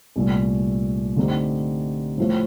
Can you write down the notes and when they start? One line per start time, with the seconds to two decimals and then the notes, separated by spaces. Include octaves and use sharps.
0.16 C2 A#2 A3
1.16 D3 A3 C4 D#4 G4
2.18 A2 F3 A3